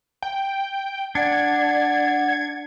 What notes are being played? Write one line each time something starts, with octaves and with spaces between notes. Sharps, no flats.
G5
D4 D5 F#5 G#6